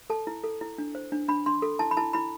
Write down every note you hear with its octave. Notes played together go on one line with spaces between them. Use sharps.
A4 A5
E4
A4
E4
D4
C5
D4
D4 B5
D4 C6
A4
E4 A5
B5
E4 A5
E4 B5